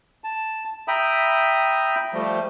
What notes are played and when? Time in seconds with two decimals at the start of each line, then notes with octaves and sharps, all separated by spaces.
0.24 A5
0.88 E5 G5 A#5 B5 D#6
2.13 F3 G3 A3